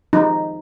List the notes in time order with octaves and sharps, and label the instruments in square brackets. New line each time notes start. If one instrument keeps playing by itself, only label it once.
[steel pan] F3 D#4